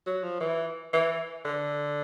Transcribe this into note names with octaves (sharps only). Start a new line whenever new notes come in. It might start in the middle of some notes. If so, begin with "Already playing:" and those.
F#3
F3
E3
E3
D3